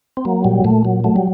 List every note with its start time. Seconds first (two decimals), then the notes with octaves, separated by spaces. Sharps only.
0.17 C4
0.25 F#3 A#3
0.45 A#2 G3
0.64 A#2 A3
0.85 F#3
1.04 F#3 A3
1.16 G3